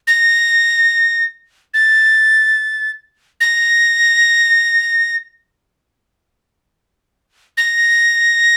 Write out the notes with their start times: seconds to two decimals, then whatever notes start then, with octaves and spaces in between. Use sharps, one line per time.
0.07 A#6
1.74 A6
3.41 A#6
7.57 A#6